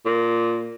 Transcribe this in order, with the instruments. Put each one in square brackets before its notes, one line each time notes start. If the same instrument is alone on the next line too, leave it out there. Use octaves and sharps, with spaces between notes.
[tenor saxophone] A#2